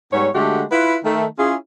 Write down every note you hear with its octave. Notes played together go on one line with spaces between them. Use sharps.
G#2 G3 B3 C#5
D3 G#3 A3 F#4 G4
E4 F4 B4
D#3 A3
C#4 E4 F4 G#4